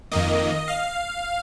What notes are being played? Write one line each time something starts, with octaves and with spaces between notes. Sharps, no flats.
F2 D#3 A#3 D#5
F5